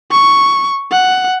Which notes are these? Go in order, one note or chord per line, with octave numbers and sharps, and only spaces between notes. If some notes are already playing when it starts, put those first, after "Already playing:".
C#6
F#5